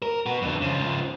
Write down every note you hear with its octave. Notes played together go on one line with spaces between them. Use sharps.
A#4
B3 F#4
F2 D3
C#3 F3